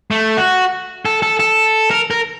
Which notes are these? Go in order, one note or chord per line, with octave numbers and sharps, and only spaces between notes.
A3
F#4
A4
A4
A4
A#4
A#4